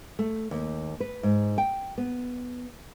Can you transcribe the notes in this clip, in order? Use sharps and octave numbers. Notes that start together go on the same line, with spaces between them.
A3
D#2
B4
G#2
G5
B3